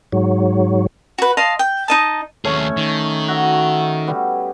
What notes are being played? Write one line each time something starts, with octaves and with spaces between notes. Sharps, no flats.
G#2 F#3
F#4 B4
D#5 F5 A5 C6
G5
D#4 D#5 A5
D#2 A3 C#4 G#4 C#5
D#3
F#4 E5
G3 B3